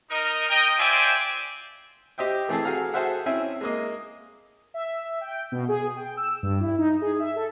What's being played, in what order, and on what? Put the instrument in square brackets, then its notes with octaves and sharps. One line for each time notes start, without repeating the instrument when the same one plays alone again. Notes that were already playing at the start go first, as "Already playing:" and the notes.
[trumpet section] D#4 A#4 D#5
A#4 D#5 G5
F4 C5 D5 E5 G5 G#5
[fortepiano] G4 C5 D#5 E5 G5
E3 A3 C4 G#4 A4
F#4 G#4 A4 F5 A#5
F#4 G#4 A4 C5 E5 F#5
C4 C#4 E4 E5 G#5
G#3 A#3 D#5
[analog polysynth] E5
G5
B2
G#4
G5
E6
G2
E4
D#4
G#4
E5
A4